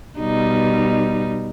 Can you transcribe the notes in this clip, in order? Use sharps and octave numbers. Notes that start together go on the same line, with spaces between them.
B2 G3 D#4